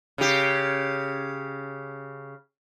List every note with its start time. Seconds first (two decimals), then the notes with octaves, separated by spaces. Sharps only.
0.18 C#3 G4